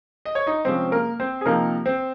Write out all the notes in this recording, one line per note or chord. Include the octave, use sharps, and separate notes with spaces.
D#5
C#5
D#4 D#5
C3 F3 G#3 C4 C#4 C5
A#3 A#4
C4 C5
G#4
C3 F3 A#3 C4 D#4 A#4
C4 C5